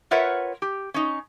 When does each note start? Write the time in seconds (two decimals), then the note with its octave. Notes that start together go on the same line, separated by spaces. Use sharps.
0.11 F4 A#4 B4 C#5 E5 F#5
0.62 G4
0.94 C#4 D#4